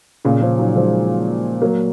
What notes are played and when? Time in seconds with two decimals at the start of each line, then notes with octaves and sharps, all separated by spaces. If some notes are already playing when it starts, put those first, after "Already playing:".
0.25 A#2 C#3
0.42 C#3 F3
0.59 D#3 F#3
0.76 F3 G#3
1.62 F#3 A#3